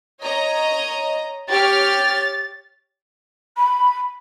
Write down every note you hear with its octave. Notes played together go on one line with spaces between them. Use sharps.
C#5 D#5 A#5
G4 C#5 F6 A6
B5